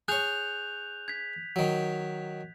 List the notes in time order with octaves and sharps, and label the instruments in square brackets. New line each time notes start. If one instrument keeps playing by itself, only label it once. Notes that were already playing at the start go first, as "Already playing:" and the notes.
[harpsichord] G#4 C#5 [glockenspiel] F#6 G6 F7
[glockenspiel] G#6 B6
[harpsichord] D#3 F#3